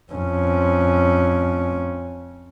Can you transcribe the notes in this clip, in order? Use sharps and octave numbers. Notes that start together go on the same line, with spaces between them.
F2 C#4